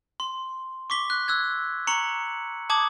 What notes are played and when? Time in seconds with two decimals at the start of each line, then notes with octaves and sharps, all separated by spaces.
0.20 C6
0.90 C#6 D6 B6 G7
1.10 F#6
1.28 E6 F#6 G#6
1.87 A#5 C#6 C#7 F#7
2.70 A5 D6 D#6 G#6 F#7